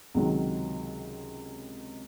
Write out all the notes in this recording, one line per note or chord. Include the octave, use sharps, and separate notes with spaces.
C#2 C3 D#3 F#3